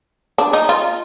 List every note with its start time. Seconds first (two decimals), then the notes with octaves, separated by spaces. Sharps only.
0.38 D4
0.53 D#4
0.69 F4